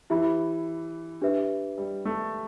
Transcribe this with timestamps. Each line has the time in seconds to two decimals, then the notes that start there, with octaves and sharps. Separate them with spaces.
0.10 E3 E4 G4 E5 B5
1.21 D4 G4 B4 E5
1.78 G3
2.05 A3